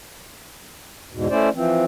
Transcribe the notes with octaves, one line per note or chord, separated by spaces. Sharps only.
E2 G#2 B2
A3 C#4 E4 C5 D5
E3 F3 C4